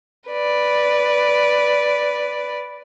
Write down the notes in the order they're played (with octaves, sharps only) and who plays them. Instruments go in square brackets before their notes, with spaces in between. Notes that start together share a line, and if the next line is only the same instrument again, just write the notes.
[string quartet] B4 D5